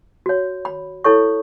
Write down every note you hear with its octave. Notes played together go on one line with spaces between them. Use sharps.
F#4 C#5
B5
E4 A4 C#5 C#6